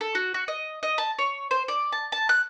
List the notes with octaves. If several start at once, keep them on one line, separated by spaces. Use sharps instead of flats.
A4
F#4
F#4
D#5
D#5
A5
C#5
C5
D5
A5
A5
F#6